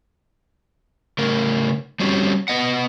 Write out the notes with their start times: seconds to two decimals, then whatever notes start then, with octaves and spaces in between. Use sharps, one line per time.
1.18 C#3 A3 A#4
2.00 G3 C4 C#4 F#4 G4
2.48 B3 D#5 F#5